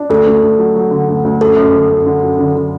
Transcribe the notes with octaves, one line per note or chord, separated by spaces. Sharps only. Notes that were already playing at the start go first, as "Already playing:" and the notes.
Already playing: D4
D2 A4
D2
D2
F#3
F#3
D3
D2
D2
F#2 A4
F#2
D3
F#2
D3
F#2
D3
D3